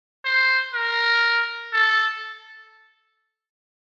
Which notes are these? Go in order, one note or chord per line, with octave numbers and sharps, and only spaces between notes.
C5
A#4
A4